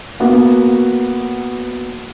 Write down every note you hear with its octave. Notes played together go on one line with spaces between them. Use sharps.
A#3 B3 F#4